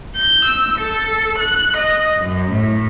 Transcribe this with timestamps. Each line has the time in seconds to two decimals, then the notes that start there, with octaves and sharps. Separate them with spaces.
0.16 G6
0.46 E6
0.80 A4
1.41 F#6
1.79 D#5
2.22 F#2
2.54 A2